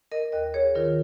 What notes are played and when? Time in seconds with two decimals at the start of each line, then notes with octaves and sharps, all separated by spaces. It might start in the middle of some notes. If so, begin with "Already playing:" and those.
0.12 A#4 D#5
0.32 D#2 A#4 D#5
0.54 G#4 C#5
0.75 D#3 F4 A#4